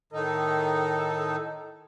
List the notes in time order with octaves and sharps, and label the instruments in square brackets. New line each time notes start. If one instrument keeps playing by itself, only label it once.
[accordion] A2 D#3 D#4 [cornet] A4